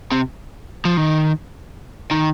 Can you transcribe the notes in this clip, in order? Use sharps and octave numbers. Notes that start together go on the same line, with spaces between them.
C3
F3
D#3
D#3